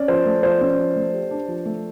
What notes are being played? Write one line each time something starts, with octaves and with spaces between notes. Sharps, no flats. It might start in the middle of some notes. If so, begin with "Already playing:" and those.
Already playing: C#4 D5
F3 C5
A3
F3 C5
C#4
F3
A3
G4
D4
F3
A3